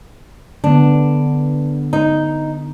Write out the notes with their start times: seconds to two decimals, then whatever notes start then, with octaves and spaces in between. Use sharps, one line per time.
0.64 D3 B3 D4
1.93 D#4